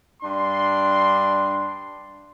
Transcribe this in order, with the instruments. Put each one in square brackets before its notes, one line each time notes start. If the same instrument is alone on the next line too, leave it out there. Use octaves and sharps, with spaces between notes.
[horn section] G2 D4 C6